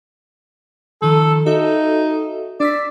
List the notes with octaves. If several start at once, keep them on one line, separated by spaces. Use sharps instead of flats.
D#3 F3 A4
D#4 F#4 A4 E5
D4 D5 E6 B6